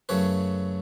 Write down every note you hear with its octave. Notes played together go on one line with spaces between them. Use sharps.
F#2 C#3 F#3 A3 B4 C#5